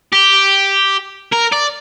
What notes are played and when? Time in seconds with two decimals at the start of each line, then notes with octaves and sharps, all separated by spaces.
0.12 G4
1.32 A#4
1.52 D5